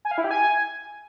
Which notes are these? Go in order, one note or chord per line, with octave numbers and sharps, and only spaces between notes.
G#5
F5
E4
G4
G#5